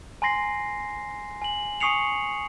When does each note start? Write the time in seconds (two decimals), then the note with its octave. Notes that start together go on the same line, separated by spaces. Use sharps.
0.22 G#5 A#5 C6 A#6 C7
1.42 G#5 F#7
1.80 G#5 C#6 D#6 C7 C#7 F7